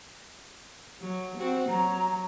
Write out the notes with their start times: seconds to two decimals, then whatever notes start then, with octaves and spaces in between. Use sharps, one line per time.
1.00 F#3
1.38 C4 F#4
1.69 F#3 A#5